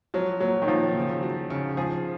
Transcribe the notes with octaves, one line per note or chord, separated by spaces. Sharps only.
F3 F#3
A#2 F#3
D#3
A#2 F3
C#3
F#3
C#3
F3 G#4